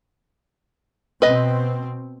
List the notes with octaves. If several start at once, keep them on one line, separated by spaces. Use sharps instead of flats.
B2 C4 B4 D#5